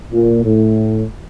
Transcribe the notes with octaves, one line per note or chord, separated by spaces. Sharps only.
A#2
A2